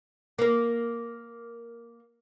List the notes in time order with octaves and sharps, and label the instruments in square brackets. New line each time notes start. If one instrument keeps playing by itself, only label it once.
[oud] A#3 A#4